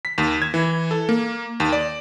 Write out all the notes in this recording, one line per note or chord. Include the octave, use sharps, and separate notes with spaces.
B6
D#2
G#6
E3
A4
A#3
D#2
D5